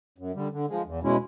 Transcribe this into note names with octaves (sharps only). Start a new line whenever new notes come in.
F#2
D3 G3
D3
F3 G#3
E2
B2 G#3 C#4 E4